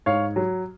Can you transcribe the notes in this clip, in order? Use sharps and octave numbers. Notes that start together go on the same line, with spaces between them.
G#2 C#5 F5
F#3